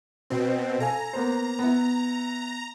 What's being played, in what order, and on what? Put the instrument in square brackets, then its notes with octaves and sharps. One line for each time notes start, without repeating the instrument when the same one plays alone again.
[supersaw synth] B2 C4
[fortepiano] A4 F5 G#5 [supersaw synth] A#5
[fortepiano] A#3 B3 C5
B3 E4